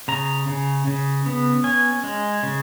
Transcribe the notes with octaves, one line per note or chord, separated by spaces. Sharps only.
C#3 A#5
C#3
C#3
B3
C#4 G#5
G#3
C#3